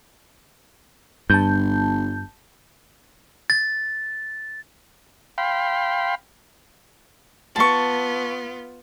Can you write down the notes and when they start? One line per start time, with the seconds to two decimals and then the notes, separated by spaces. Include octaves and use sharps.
1.30 G1 G2 A5 G6
3.50 A6
5.38 F5 G5 B5 C6
7.56 B3 F4 A5 C#6